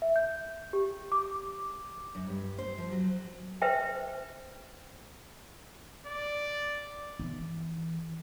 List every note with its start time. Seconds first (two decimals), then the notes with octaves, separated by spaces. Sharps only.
0.02 E5
0.16 G6
0.73 G4
1.12 D6
2.15 F#2
2.27 G2
2.58 C5
2.78 F3
2.92 F#3
3.62 B4 C5 E5 G5
6.07 D5
7.19 E3